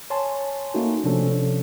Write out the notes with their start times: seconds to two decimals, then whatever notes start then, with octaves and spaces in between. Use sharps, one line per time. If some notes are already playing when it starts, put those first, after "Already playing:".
0.10 C#5 G#5 A5 C6
0.74 A3 A#3 C#4 D#4 F#4
1.04 C3 F3 C#4 D4 A4